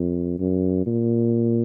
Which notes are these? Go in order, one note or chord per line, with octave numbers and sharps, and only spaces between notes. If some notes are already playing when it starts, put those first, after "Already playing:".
Already playing: F2
F#2
A#2